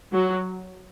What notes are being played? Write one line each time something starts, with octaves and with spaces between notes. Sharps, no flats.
F#3